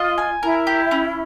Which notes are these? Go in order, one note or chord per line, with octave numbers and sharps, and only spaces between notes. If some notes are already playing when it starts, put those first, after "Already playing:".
Already playing: F4 D#5
G#5
E4 A#4
G4
C#4